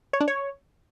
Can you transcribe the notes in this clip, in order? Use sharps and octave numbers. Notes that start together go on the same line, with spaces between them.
C#5
D4
C#5